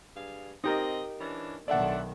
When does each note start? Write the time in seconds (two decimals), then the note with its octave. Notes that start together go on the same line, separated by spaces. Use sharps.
0.16 G2 G#4 F5
0.64 C4 D#4 G4 A#4 D#5
1.20 E3 C#4 D4
1.68 B1 D#3 D4 A4 D5 E5 F#5